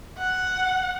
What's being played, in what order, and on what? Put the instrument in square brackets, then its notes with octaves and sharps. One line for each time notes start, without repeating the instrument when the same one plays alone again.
[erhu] F#5